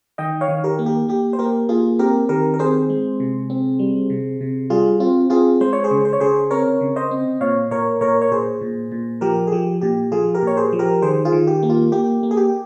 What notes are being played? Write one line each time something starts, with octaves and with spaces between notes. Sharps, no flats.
D#3 D#5 G5
C#5 F5
D#3
G4 A#4
A#3
G4
A#3 G4
C5
A#3 G4 A#4
A#3 F4 G#4
C4 G4 A#4
D#3 G4 A#4
A#4
C4 G#4 C5
G#3
C3
C4
G3
C3
C3
G3 F4 G#4
C4 F4
C4 F4 G#4
G#3 C5
C#5
G#4 C5
C#3
C5
C#5
C#3 G#4 C5
C4 A#4 C#5
C#3
C5 D#5
C4
A#2 C#5 F5
A#2 A#4 C#5
A#2 A#4 C#5
C#5
A#2 G#4 C5
A#2
A#2
F3 G4 A#4
G#4
F3 G4
A#2 G4
F3 F4 G#4
G4 A#4
A#2 C#5
G#4 C5
F3
G4 A#4
D#3 G#4 C5
F4 G#4
D#3
G4
A#3
F4
A#3 G4
A#3
G#4
G4